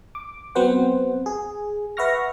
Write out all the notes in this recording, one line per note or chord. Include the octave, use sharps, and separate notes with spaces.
D6
F#3 B3 C4 B4 C5 F#5
G#4
B4 E5 F#5 C#6 F6 A#6